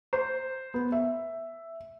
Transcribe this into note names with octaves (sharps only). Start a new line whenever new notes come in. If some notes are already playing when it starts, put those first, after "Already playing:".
C5
B3
E5